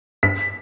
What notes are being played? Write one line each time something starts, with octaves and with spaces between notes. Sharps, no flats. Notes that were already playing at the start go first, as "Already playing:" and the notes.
G2 B6